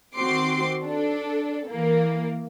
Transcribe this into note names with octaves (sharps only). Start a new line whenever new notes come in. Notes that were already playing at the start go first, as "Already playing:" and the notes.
D#3 C4 F#4 C6 D6 C7
D4 A4
E3 A#3